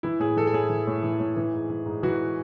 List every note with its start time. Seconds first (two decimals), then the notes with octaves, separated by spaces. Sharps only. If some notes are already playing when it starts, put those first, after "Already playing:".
0.03 E3 E4
0.20 A2 G#4
0.37 E3 A4
0.47 A4
0.53 A2 G#4
0.70 E3
0.87 A2
1.03 E3
1.20 A2
1.36 E3
1.53 G#2
1.70 E3
1.86 G#2
2.03 E3 F#4